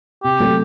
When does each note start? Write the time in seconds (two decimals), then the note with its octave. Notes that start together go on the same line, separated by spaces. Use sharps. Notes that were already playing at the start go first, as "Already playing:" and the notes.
0.24 C3 G4
0.40 F#3 A3 C4